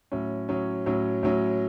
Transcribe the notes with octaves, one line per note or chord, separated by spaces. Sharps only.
A2 F#3 C#4
A2 F#3 C#4
A2 F#3 C#4
A2 F#3 C#4